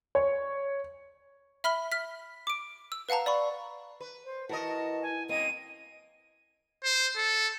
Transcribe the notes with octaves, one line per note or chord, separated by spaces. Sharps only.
C#5
E5 B5 F6 B6 G7
F6 B6
D6 D7
E6
B4 F5 F#5 A5 A#5
D5 B5 C#6
B4
C5
E3 F#4 A#4 D#5 A5
G#5
F#2 A#3 C4 D#5 D#7
C5
A4